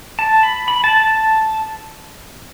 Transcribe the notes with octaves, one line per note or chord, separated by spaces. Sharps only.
A5
B5
B5
A5
A5